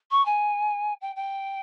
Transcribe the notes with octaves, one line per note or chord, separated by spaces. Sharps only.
C#6
G#5
G5
G5